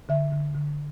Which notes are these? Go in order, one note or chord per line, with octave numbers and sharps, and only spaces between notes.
D3 E5
D3
D3